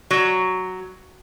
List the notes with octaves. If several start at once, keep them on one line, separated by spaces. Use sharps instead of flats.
F#3